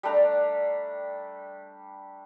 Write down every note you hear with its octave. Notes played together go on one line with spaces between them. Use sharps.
G3 A3 D4 A#5